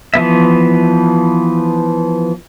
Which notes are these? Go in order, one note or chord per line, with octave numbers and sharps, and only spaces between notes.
E3 F3 B3 E5